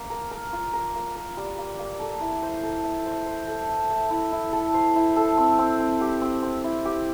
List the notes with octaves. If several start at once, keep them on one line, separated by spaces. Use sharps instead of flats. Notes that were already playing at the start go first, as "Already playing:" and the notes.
Already playing: A#3
A#4
A#4
F4
A#4
A#3
A#4
G3
A#3
A#3
A4
E4
C5
A4
E5
C5
C5
A4
E5
E5
E4
E4
A4
C5
E4
A4
C4
C4
C4
G4
C4
C4
E4
G4